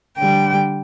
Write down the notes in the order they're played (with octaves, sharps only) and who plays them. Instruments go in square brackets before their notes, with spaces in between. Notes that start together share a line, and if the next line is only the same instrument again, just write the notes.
[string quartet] D3 G3 G5